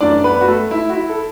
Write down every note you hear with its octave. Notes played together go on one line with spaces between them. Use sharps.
F#2 E3 A3 D4 D5
B3 B4
F#4
A3 A4
E4
F#4
E4
A4